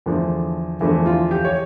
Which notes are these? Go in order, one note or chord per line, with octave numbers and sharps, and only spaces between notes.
E2 D3 F3 A3 D4
E2 D3 F3 A3 E4
F4
G4
C#5